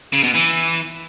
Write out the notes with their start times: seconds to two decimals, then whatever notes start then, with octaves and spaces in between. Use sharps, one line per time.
0.13 C#3
0.24 B2
0.34 E3